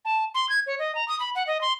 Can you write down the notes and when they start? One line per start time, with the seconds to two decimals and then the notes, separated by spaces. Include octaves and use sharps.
0.05 A5
0.35 C6
0.49 G#6
0.67 C#5
0.79 D#5
0.95 A#5
1.08 D#6
1.20 B5
1.35 F#5
1.47 D#5
1.61 C6